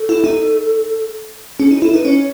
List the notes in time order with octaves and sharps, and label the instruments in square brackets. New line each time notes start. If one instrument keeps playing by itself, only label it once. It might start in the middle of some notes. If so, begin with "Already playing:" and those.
Already playing: [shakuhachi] A4
[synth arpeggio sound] E4
D#4
[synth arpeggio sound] C#4 [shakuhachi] G#4
[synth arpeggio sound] D#4 [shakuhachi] E4
[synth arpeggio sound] E4 [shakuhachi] A4
[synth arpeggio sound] D#4 [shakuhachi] B4
[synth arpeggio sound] C#4 [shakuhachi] C#5